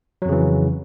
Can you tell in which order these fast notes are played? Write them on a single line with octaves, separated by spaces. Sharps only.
F#3 F2 C#3 E3